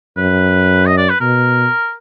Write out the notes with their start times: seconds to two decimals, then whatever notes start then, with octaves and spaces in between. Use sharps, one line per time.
0.17 F#2 B4
0.87 D#5
0.97 D5
1.10 B4
1.21 B2 A#4